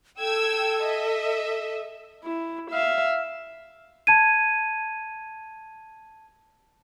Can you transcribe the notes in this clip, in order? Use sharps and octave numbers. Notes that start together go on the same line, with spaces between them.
A4 G5 E6 G#6
D#5 E5
E4
E5 F5
A5 G#6 D#7